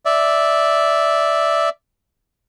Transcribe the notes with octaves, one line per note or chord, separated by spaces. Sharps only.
D5 E5